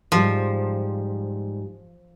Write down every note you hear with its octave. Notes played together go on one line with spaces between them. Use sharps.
G#2 F3 G3